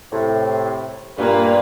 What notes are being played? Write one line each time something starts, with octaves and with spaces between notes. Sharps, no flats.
A2 C3
G2 A#2 A#3 B4